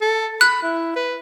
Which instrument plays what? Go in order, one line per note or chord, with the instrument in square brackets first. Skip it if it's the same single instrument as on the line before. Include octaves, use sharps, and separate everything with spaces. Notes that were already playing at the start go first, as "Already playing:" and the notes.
[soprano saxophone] A4
[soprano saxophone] B5 [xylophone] F#6
[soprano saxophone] E4
B4